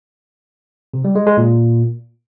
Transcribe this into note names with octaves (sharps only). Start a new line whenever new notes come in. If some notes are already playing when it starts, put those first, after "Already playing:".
C3
G3
G#3
G#3
A#2